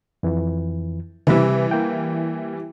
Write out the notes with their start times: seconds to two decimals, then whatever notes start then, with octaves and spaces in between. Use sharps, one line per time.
0.23 F2 E3
1.27 C3 E3 G3 B4 E5
1.71 A#3 G5